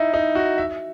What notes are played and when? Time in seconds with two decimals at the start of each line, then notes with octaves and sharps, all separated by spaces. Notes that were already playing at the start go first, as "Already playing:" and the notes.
Already playing: D#4 E4
0.14 D#4
0.35 F#4
0.58 E5